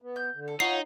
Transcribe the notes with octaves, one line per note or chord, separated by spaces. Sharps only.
B3
G6
D3
A4
D#4 F4 C#5 F#5 B5 C7